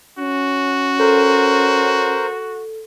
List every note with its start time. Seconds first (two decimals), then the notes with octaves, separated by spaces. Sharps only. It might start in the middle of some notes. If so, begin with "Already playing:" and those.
0.18 C#4 F#4
0.99 A4 A#4 C5